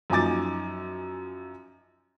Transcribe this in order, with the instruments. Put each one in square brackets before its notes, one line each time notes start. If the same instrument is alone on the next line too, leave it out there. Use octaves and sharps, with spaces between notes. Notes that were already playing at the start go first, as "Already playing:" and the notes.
[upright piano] F#2 F3 D#4 G#5 D6 A6